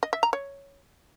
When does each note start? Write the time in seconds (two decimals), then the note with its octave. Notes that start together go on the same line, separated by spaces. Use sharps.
0.03 D#5
0.13 E5
0.23 A#5
0.33 C#5